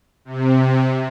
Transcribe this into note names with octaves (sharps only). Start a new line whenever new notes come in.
C3